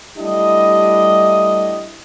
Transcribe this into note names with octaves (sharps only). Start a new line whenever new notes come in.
G3 A3 D4 E4 G4 D#5